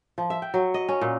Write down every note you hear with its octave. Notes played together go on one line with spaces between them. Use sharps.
F3
E5
G5
F#3
D#5
C#4
A#2